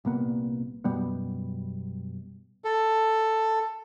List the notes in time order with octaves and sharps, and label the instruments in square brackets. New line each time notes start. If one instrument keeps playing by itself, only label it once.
[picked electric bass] C2 A#2 A#3 B3
F#2 B2 G3 B3
[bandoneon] A4